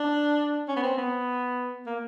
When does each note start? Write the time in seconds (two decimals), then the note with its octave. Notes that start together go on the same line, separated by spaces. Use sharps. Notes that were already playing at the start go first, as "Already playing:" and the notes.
Already playing: D4
0.68 C#4
0.76 B3
0.83 C4
0.98 B3
1.86 A#3